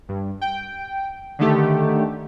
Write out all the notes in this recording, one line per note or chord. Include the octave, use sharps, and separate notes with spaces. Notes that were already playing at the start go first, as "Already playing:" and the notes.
G2
G5
D3 D#3 A3 G4